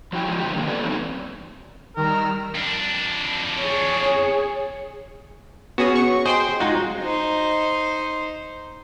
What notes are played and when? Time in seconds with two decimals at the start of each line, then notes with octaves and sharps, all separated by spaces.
0.13 F3 F#3 E4 G5
0.25 F3 G#3
0.40 C3 D#3 G4
0.55 D3 D#3 A3 A#3
0.67 A#3 B3 G4 A4 B4 D5
0.83 E3 F#3 G3 A3 C4 D#4
1.97 D#3 G3 A#4 E6 F6
2.55 F2 D4
3.59 G#4 C#5
5.78 B3 C#4 F#4 G#4
5.95 C#6
6.25 G#4 C5 D#5 G5 C6
6.60 G#3 D#4 F4 F#4
7.01 D#4 C5